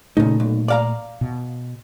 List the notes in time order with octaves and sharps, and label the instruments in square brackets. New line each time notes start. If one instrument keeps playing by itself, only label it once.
[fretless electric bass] A#2 A3 [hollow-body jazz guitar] C#3 D#4
[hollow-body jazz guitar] B1
D5 F5 A#5
[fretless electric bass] B2